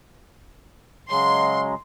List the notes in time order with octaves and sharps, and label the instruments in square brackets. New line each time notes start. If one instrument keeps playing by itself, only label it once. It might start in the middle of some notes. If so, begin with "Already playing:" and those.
[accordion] C#3 F#3 G#3 [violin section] C6